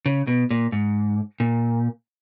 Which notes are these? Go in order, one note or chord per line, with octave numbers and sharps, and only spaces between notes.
C#3
B2
A#2
G#2
A#2